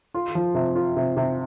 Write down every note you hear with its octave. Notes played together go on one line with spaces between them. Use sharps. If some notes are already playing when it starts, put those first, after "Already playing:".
F4
F3
C3
F4
C3
C3